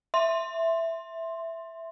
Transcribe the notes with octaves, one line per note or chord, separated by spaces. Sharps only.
E5 C6